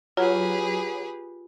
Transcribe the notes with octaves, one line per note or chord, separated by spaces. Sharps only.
F#3 F4 G4 G#4 B4